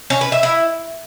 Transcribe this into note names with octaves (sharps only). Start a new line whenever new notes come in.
C#4
B4
E5
E4